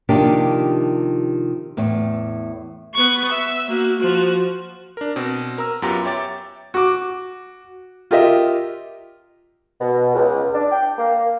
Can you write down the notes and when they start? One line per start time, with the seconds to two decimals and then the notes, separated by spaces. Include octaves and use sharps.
0.09 C3 D#3 F3 A#3 D4 G4
1.77 E2 A2 C4
2.94 B3 C#6
3.31 E5
3.69 A#3 F#4
3.99 F3 F#4
4.97 D4 A#4
5.16 B2 C4
5.58 A#4 A#5 E6
5.82 F#2 B3 F4 G4 A#5
6.05 C#5 E5 G5 D6 A6
6.74 F#4 D6
8.11 F4 G4 A#4 D#5 E5
9.81 B2
10.14 C#2
10.55 D4
10.71 G5
10.98 A#3